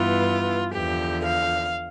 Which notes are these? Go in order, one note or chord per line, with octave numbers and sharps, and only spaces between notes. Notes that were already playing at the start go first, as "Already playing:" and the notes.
Already playing: G2 E3 B3 F4
E2 D3 F3 G4
F5